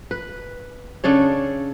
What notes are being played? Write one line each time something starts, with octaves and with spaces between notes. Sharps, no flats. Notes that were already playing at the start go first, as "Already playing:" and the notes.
B4
C#3 D4 A4 C#5